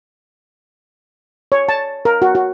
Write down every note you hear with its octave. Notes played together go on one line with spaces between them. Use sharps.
C#5
A5
A#4
F#4
F#4